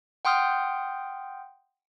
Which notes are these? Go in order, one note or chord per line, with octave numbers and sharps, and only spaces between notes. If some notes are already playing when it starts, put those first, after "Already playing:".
F#5 G5 C6 D#6 F6 G6